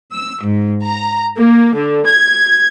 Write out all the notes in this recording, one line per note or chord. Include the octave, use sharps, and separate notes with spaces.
E6
G#2
A#5
A#3
D3
G#6